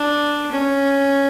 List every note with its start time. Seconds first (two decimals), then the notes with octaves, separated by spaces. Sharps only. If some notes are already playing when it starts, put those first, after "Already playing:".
Already playing: D4
0.52 C#4